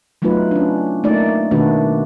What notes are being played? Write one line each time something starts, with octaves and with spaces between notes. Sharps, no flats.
F#3 A3 B3 D#4 F4 B4
C#4 D4
A3 A#3 D#4 D5
B2 D#3 A3 D4 F#4 B4